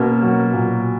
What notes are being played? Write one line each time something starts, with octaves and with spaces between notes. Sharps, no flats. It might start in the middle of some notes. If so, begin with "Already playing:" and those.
Already playing: B2 A#3 C#4
F#3
A#2